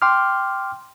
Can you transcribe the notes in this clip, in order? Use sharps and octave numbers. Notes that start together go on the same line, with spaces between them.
G5 C6 D6 F6